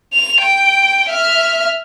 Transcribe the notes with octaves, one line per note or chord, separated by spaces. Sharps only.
F7
G5
E5 F6